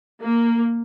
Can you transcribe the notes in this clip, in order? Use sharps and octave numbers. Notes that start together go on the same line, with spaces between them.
A#3